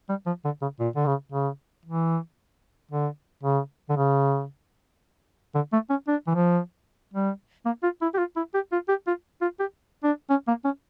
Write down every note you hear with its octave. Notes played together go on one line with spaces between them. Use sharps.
G3
F3
D3
C#3
A#2
D3
C#3
C#3
E3
D3
C#3
D3
C#3
D3
A3
C#4
D4
E3
F3
G3
A#3
F4
E4
G4
F4
E4
G4
F4
G4
F4
F4
G4
D4
C#4
A#3
C#4